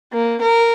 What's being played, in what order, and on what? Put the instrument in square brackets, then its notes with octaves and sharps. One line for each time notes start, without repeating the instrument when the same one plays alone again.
[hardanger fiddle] A#3
A#4